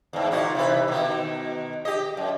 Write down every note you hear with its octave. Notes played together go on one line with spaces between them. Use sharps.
E2 G#2
A#2 D#4 F#4
C3 E3 B4
B2 D#3
G4 D#5
F#2